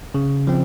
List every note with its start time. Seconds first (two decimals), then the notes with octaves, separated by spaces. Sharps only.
0.14 C#3
0.47 F3 C4